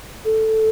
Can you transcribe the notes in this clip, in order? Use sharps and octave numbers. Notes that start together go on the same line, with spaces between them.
A4